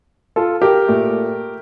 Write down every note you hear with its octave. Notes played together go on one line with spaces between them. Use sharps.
F4 A4
G4 A#4
A#2 A3